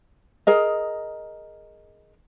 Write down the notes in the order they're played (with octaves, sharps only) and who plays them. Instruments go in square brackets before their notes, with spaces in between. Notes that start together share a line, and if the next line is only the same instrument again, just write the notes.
[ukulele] G#4 A#4 D#5